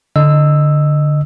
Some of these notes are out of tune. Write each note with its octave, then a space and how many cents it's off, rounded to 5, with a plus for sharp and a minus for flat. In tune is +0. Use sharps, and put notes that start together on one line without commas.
D3 +0 D#5 -5 E6 +0